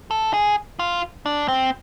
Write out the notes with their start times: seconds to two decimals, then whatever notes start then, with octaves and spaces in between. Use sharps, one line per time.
0.11 A4
0.34 G#4
0.79 F4
1.26 D4
1.48 C4